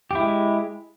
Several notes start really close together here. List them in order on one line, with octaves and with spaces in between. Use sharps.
G4 E4 G#3